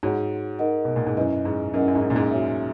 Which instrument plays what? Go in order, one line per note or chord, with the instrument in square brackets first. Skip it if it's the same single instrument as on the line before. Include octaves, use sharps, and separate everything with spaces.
[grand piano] G#2 [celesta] F#4 C#5 F#5
[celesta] D#4 A#4 D#5 F#5
[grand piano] B2
A#2
G#2
[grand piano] F#2 [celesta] E4 B4 D#5
[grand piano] G#2
[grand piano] F#2 [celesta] E4 A#4 D#5 F#5
[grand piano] F#2
G#2
F#2
A#2
G#2
[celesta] F#4 C#5 E5